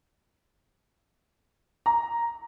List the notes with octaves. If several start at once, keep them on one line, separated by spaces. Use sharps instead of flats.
A#5